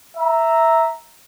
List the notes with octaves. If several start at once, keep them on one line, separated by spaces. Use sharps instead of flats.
E5 A#5